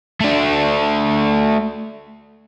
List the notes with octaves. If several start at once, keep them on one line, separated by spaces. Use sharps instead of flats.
A3 D4